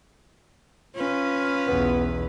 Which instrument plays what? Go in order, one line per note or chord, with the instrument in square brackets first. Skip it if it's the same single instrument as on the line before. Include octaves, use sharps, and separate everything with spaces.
[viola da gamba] C#4 B4 [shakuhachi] F4
[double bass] B1 E2 [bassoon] B3